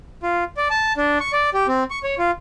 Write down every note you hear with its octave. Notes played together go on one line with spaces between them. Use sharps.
F4
D5
A5
D4
C#6
D5
G4
C4
C#6
C#5
F4